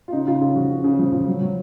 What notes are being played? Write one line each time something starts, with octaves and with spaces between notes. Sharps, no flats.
F4
C#3 D#4
C#3 F4
C#3 F4
F3 F#4
C#3
C#3
F3
F3
F#3
F#3